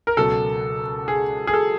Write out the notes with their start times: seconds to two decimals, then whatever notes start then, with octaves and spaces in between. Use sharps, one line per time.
0.07 A#4
0.17 C#2 B2 F#3 A4
1.08 G#4
1.47 G#4
1.53 A4